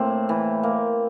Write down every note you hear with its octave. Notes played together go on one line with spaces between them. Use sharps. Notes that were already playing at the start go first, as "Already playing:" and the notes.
Already playing: A2 A#3 C4
E3
A#3